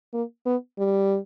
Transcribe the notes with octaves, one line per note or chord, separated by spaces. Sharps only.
A#3
B3
G3